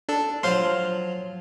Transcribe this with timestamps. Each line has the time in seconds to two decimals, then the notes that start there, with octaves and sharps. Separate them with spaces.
0.09 D4 A4
0.43 F3 F#3 C5 F5 C6